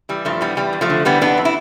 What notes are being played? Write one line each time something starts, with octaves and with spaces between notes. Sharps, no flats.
E3 G3
G2 F3 A3
E3 G3 B3
E2 G3
E2
F3 A3
D3
E3 G3 B3
F2 B3 D4
E3
E4